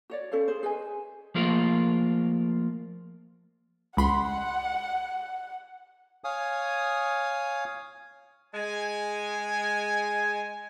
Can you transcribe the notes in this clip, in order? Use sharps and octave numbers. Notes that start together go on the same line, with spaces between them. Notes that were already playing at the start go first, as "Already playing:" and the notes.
F#4 C#5 D5
C#4 A4 C5 F5
G#4 C5
G#4 B4 D#5 G#5
F3 A3 A#3 F4 G#4 A#4
C#2 F#5 B5 C6
C#5 F5 G#5 D#6
G#3 G#5